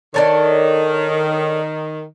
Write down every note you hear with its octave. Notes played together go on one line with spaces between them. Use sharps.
D#3 D4 A4 C#5